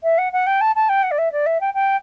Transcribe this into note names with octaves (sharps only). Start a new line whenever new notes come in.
E5
F#5
F#5
G5
A5
A5
G5
F#5
D5
E5
D5
E5
G5
G5